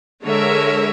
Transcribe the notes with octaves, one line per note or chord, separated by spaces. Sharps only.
D3 G#3 A#4 C#5 E5